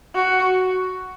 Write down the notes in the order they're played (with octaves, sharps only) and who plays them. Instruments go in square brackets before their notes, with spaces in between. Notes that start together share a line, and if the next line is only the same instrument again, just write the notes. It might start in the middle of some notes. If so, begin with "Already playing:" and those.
[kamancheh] F#4